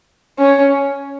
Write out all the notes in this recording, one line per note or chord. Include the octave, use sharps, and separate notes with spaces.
C#4